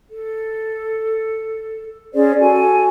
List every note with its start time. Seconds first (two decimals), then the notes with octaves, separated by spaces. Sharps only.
0.10 A4
2.14 C#4 G#4 C5 D5
2.40 F#4 A4 G#5